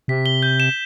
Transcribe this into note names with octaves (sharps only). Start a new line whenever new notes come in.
C3 B6
G7
G6
E7